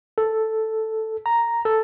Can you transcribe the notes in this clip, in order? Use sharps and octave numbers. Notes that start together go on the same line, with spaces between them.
A4
A#5
A4